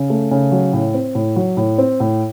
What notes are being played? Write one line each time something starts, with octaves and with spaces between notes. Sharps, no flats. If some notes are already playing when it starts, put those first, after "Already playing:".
Already playing: C#3
A3
C#3
F#3
A2
C4
A2
F#3
A2
C4
A2